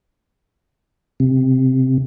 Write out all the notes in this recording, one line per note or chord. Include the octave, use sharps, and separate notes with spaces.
C3